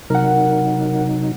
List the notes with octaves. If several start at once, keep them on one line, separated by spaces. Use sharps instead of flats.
C3 F#3 D#4 A#4 F#5